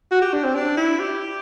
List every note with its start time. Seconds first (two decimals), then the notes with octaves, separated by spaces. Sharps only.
0.12 F#4
0.22 G4
0.34 D4
0.45 C4
0.55 D4
0.77 E4
1.00 G4